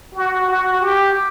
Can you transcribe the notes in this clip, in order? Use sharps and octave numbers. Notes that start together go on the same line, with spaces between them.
F#4
F#4
G4